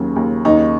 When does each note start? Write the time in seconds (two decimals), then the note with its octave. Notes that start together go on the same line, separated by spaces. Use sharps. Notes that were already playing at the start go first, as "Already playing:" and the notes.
Already playing: D#2 C#3 F#3
0.16 D#2
0.45 D#2 D#4